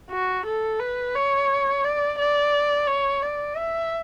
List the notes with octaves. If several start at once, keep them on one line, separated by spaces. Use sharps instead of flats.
F#4
A4
B4
C#5
D5
D5
C#5
D5
E5